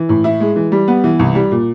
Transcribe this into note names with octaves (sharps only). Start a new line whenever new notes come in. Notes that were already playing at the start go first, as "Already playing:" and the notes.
Already playing: E3
A2
E4
G#3
E3
G3
B3
E3
C2
G3
A#2